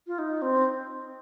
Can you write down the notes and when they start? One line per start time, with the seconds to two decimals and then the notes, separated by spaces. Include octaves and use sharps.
0.07 F4
0.19 D#4
0.42 C4